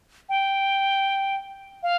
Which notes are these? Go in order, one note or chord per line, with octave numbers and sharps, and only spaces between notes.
G5
F5